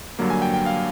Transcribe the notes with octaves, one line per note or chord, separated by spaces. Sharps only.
G2 D3 F#3 A#3
G#5
G5
G5
F5